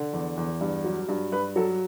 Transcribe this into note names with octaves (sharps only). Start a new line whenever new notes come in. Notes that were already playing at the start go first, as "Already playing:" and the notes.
Already playing: D3
E2
E2
G2
F#3
G2
G2 B4
F#3 A4